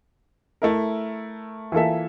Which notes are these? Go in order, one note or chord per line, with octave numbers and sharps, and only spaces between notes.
A3 E4 A#4
E3 A#3 F4 A4 E5